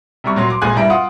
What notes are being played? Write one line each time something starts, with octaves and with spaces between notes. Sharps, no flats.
C3 G3 C#6
A#2 F#3 C6
C6 D6
G#1 A#2 G#4 G#5 C6 F#6
G2 G3 E4 A#5 D7
F4 F#5 D#6